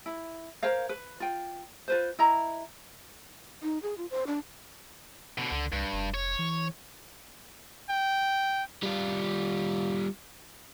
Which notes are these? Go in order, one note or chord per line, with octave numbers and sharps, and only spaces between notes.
E4
A#4 C5 C#5 F5
B4
F4 G5
F4 B4 C5
E4 D#5 A#5
D#4
G#4
F4
C5
D4
B2 D3
C#2 D3
C2 G2
F1
C#5
E3
G5
G3 F4